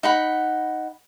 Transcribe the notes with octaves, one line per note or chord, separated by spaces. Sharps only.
D#4 F#5 B5